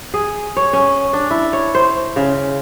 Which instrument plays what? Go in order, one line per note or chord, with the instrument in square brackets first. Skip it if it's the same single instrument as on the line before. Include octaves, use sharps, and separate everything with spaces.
[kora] G#4
C#5
C#4
D4
E4
C#5
C5
C#3